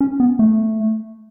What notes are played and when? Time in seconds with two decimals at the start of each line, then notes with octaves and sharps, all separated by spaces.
0.01 C#4
0.20 B3
0.39 A3